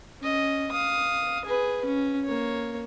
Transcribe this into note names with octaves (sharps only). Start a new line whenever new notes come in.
C#4 D#5
F5 D#6
G#4 B4
C#4
A#3 C#5